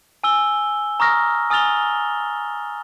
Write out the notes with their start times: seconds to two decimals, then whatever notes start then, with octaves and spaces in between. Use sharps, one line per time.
0.24 G#5 E6 G7
1.00 A#5 C#6 D#6 F6 A#6
1.50 G#5 D#6 F6 A6 F7 G7